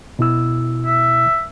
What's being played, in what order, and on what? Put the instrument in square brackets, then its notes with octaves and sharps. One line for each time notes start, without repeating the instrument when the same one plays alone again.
[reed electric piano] B2 E4 E6
[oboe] E5